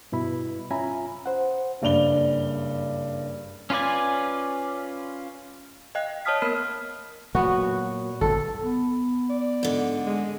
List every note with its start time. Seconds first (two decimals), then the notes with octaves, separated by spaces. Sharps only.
0.12 G2 B2 E4 B5
0.71 C#4 F4 E5 G#5 A#5 B5
1.26 C5 F#5
1.82 F#1 G2 D5 F7 G7
3.70 C#4 F4 B4 D5 G#5
5.95 D#5 F5 G5 F#6
6.25 C#5 D#5 A5 D#6 F6 B6
6.42 A#3 B3 A#4 B5 F6 B6
7.35 A#2 F#3 B3 F#4
8.21 G1 F2 A4
8.61 B3
9.30 D5
9.63 G#2 D3
10.07 G#3